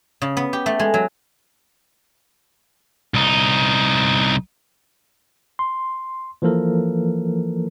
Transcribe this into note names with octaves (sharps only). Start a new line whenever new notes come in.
C#3
B3
G4
A3
G#3
F#3
C2 D#4
C6
E3 F3 A#3 A4 A#4